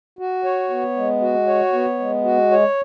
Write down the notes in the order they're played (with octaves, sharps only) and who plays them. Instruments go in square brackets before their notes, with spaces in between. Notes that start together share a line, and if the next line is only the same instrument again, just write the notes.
[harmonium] F#4
C#5
B3
G#3
F#4
C#5
B3
G#3
F#4
C#5